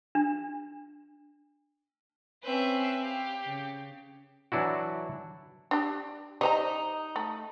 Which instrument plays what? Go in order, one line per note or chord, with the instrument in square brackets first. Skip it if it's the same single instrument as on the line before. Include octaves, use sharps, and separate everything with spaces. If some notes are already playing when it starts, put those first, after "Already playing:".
[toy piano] D4
[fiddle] C4 C#4 [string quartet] B4 E5
[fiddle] G4 [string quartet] F5
[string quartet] C#3
[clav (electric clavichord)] E3 F#3 D4 E4 F#4
[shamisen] D4 G4
[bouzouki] D#4 [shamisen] G4 C5 A#5
[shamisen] A3